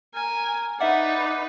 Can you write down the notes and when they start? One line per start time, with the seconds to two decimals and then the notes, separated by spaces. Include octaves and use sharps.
0.15 A#4 G#5
0.81 D#4 B4 D5 E5 F#5